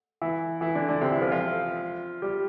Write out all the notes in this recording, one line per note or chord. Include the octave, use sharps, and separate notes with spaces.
E3 E4
E3 E4
D3 D4
D3 D4
C3 C4
E3 E4
F3 F4
F3 F4
G3 G4